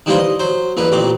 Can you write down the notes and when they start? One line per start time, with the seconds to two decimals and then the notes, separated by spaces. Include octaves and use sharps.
0.06 D#3 E3 G3 A#3 F4 C5
0.19 D#5
0.39 F#3 C5
0.77 A1 E2 A#3 B4
0.92 A1 A#2 C4 D6